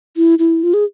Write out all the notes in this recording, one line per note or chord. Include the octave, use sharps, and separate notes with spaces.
E4
E4
F4
G#4